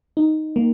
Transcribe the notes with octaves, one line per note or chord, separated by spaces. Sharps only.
D#4
A#3